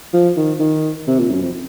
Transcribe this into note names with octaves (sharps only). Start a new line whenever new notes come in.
F3
D#3
D#3
C3
A#2
F#2
F2